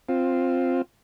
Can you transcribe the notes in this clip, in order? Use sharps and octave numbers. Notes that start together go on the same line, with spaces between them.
C4 F4